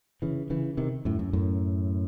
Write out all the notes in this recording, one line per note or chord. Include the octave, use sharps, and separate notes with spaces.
C#3 E3
C#3 E3
C3 D#3
F#2 A2
F#2
F#2 A2